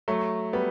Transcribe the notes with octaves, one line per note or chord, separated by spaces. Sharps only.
F#3 A3
G3 B3